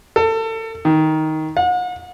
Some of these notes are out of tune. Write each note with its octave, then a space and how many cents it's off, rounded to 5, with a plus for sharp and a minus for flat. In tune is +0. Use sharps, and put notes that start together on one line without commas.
A4 +30
D#3 +10
F#5 -40